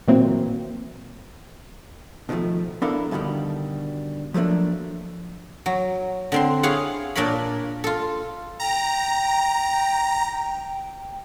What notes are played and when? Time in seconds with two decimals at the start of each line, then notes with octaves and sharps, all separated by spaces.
0.08 A#2 D#3 E3 F#3 A#3 C4
2.29 B2 D3 D#3 F3 A3
2.82 B3 D4 E4 A4 A#4 F5
3.11 G2 B2 D3 D#3 G3
4.34 F3 F#3 A3 A#3 D4
5.66 F#3
6.32 D3 C4 C6
6.63 E4 G#4 C#5 F5 F#5
7.15 A#2 D4 A#4 C#5 B5
7.84 F4 A4
8.60 G5 A#5